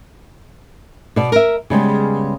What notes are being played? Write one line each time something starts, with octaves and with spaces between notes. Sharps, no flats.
B2 D5
A#4 E5
C#3 G3 G#3 B3